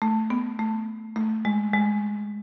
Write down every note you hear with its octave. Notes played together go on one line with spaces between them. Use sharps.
A3
B3
A3
A3
G#3
G#3